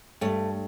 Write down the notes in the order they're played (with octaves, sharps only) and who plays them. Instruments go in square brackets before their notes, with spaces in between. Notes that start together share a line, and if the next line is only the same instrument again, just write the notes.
[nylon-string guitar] G2 A3